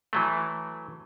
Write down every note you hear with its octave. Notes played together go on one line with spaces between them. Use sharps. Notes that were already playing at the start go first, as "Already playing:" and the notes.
E3 F#3 A3